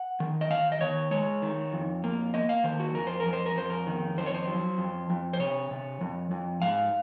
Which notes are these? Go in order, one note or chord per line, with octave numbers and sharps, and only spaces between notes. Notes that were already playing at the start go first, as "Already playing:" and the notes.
Already playing: F#5
D#3
D#5
D#3 F5
D#5
D#3 C#5
G#3 C#5
D#3
F2
A#3
A#3 D#5
F5
D#3 C5
F#4
F2 A#4
C5
A#4
F2
C5
A#4
F2 C5
A#4
D#3
F2 C5
C#5
C5
F#3
F2
F2
C5
C3 C#5
C3
F2
F2
G#2 F5